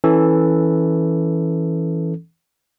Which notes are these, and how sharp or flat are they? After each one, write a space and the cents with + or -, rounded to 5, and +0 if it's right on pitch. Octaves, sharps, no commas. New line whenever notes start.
E3 -5 C#4 +0 A4 +0